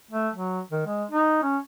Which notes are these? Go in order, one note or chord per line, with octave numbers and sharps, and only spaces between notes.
A3
F#3
D#3
G#3
D#4
C#4